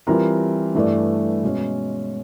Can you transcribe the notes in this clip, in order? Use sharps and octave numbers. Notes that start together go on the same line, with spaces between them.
E3 G3 C4 F4 A#4
G2 E3 A3 D4
B2 G#3 C#4